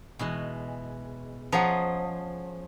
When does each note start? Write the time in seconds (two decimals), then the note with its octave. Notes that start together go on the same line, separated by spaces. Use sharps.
0.19 B2 E3 G#3
1.52 F3 C#4 G#4 D#5 F#5 A#5